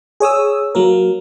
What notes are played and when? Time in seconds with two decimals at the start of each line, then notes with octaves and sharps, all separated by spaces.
0.20 G#4 C#5 D#6 E6
0.75 F#3 A#3 A#4